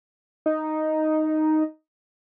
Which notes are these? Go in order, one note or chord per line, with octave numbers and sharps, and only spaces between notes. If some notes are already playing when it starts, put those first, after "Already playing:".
D#4